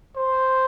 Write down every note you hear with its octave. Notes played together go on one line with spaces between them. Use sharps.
C5